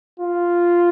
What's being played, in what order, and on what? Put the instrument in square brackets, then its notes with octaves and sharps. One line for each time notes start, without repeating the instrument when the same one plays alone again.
[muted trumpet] F4